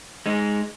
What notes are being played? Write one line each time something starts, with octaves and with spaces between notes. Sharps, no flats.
G#3 D#4